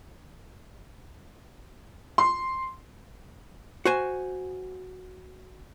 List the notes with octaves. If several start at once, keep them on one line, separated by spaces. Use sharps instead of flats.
C6
F#4 C5 G#5